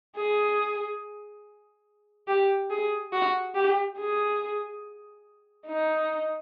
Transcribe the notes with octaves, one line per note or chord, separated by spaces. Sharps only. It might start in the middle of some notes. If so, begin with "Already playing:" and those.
G#4
G4
G#4
F#4
G4
G#4
D#4